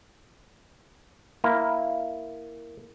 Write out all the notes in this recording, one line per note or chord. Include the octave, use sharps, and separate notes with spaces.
A#3 E4